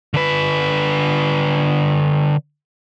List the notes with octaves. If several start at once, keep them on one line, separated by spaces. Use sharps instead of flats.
D3 B4